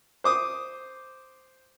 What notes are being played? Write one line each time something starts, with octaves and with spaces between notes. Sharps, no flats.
C5 D6 D#6